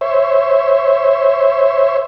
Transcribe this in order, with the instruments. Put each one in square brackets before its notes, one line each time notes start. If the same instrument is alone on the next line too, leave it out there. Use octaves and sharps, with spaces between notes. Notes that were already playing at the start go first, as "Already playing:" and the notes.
[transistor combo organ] C5 C#5 E5